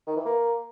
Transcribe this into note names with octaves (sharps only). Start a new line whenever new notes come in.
D#3
E3
A#3